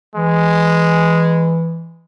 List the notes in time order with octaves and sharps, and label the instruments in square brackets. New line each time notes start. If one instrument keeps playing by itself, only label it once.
[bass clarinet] E3 [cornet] G#3